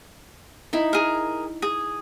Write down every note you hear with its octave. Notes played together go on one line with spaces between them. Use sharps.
D#4 E4
G#4 A#4
G#4